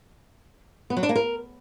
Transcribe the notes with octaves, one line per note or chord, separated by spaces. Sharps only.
B3
F#3
D4
A#3
A#4